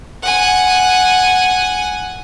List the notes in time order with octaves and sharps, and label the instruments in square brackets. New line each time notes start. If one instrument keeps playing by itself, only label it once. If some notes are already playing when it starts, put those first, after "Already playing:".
[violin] F#5 G#5